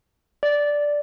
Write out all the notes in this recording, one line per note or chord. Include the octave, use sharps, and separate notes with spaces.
D5